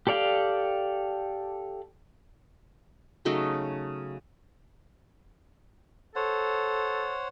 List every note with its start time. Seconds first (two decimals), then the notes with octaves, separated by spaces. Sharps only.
0.07 G4 A4 D5 F5 G5
3.25 C#3 F#3 A3 D#4
6.16 A4 C5 C#5 F#5